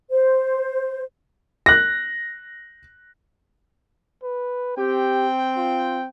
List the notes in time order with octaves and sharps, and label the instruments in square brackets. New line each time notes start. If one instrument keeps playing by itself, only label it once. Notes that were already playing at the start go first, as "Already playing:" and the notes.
[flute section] C5
[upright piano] F#6 A#6
[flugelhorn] B4
[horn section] C4 G5 [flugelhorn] G4
[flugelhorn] F4